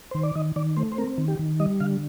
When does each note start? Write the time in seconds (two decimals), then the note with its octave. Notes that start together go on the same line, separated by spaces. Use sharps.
0.11 D#3 C5
0.23 D5
0.35 D#3 D#5
0.56 D#3 D5
0.77 A3 C5
0.92 C5
0.98 C4 A#4
1.18 D#3
1.28 G4
1.39 D#3
1.60 G3 D#5
1.80 D3 F5